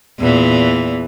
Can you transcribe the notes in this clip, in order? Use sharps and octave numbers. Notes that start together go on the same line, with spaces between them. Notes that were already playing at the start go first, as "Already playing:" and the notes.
E2 A#2 E3